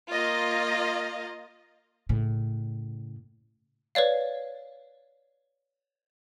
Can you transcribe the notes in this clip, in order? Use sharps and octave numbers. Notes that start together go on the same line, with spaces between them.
A#3 F4 D#5
A2 C#3
B4 C#5 D5 F5